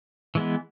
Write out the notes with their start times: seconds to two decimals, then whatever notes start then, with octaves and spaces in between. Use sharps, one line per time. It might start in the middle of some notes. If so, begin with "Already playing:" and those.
0.35 E3 G#3 B3